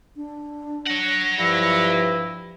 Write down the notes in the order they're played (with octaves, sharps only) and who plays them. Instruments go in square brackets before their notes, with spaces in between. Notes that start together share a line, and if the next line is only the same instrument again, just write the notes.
[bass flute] D4
[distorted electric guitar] C#5 F#5 [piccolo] A#6
[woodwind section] G2 E4 [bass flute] F3